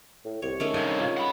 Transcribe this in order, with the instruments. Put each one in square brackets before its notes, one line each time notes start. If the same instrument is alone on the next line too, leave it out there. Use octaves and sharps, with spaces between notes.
[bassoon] A2
[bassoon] C2 [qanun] C#5
[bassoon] D#3 [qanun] G#3 A3 C#4
[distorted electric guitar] G2 C3 [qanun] G#5
[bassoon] F4
[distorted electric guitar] F#5 B5